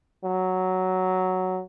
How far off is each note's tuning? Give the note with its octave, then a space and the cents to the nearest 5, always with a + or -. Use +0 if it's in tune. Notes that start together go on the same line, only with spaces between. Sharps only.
F#3 +5